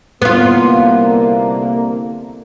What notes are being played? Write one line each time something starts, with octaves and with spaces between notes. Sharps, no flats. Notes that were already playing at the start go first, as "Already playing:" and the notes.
C2 D3 A#3 B3 F4